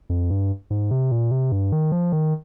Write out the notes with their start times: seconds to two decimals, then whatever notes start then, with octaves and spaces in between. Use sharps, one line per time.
0.10 F2
0.30 G2
0.70 G#2
0.91 C3
1.12 A#2
1.31 C3
1.52 G2
1.72 D#3
1.92 F3
2.12 D#3